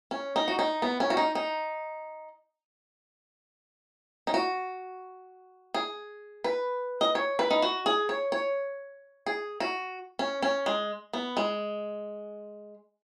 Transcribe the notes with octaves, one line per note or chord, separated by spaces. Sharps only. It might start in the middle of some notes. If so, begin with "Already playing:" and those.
C#4
D#4
F#4
D#4
B3
C#4
F#4
D#4
D#4
D#4
F#4
G#4
B4
D#5
C#5
B4
D#4
F#4
G#4
C#5
C#5
G#4
F#4
C#4
C#4
G#3
B3
G#3